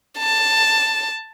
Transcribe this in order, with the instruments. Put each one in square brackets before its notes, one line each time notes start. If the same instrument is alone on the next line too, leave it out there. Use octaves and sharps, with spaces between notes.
[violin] A5